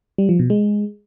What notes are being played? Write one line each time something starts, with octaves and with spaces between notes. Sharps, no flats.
G3
F3
B2
G#3